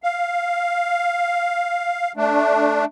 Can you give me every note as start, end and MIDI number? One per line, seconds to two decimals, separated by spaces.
0.03 2.12 77
2.17 2.85 57
2.17 2.85 62